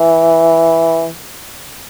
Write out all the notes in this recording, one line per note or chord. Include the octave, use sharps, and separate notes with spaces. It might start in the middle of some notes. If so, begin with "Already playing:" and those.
Already playing: E3